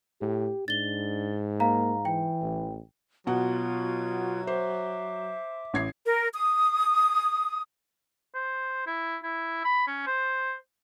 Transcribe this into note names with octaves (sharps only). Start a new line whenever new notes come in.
A2 G4
G#2 D4 A6 G7
A#3 F5 A#5
E3 G5
A1
B2 F#3 F4 F#5 G#6
C5 E5 D6
A1 G#6 C7
A#4
D#6
C5
E4
E4
B5
C#4
C5